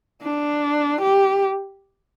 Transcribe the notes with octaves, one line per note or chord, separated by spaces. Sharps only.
D4
G4